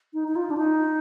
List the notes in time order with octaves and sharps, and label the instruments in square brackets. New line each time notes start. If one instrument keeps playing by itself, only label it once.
[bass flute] D#4
D#4
F4
D4
D#4